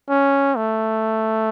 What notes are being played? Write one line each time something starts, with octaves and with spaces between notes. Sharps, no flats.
C#4
A3